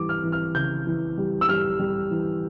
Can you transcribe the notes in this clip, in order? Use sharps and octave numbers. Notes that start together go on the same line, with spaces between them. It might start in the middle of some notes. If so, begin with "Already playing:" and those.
Already playing: E3 G3 D6
F6
E3
F6
C#3 G6
E3
G3
E6
G3 F6
G3
E3